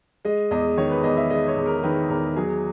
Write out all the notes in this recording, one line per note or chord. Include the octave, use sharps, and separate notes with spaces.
G#3 D#5
E2 D#5
D#3 C#5
B4
E2 D#5
E5
G#3 D#5
C#5
E2
A#4
D#3 B4
E2 A#4
F#3 G#4